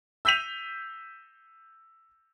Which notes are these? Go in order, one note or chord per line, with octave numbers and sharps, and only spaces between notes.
E6 G6 B6 D#7 F7